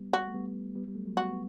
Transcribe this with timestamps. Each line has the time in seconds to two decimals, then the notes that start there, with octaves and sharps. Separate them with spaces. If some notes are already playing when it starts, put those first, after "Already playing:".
Already playing: G3 B3
0.13 F#4
0.27 A3
0.34 G3 B3
0.75 G3 B3
0.88 G3
0.95 F#3 A3
1.06 F#3 A3
1.16 G3 B3 F#4
1.32 B3